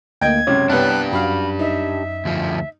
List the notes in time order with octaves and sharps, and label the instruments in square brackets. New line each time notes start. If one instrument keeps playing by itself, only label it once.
[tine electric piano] D2 A#3 [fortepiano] D#5 G5 [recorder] G#6
[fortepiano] C#2 F#2 C3 [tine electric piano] C#5
[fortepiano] C2 B3 B4 [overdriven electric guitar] D4 G4 [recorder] F#6
[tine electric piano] F#2 [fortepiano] F#4 F5 [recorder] B5
[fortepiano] D#4 [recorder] E5
[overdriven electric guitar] D2 F3